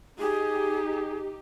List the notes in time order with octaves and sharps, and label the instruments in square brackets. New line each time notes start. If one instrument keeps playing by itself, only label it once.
[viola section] D#4 G4 [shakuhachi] G#4